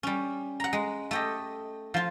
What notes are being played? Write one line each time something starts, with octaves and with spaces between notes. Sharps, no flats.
G3 C#4
F#5 A#5
G#3
A3 G4 D#5
F3 F4